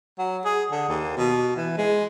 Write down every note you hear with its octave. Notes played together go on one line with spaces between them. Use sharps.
F#3
G#4
D3
D#2
B2
E3
G#3